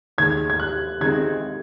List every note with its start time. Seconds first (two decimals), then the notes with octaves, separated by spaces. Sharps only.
0.18 D#2 D#3 G#3 G#6
0.50 G#6
0.60 F#6
1.01 D#3 G#3 C4 D#4 G#6